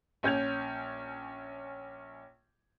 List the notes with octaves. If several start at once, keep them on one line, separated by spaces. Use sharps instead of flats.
A#1 C#4 G6 G#6 F7